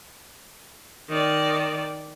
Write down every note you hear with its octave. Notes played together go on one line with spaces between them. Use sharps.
D#3 D5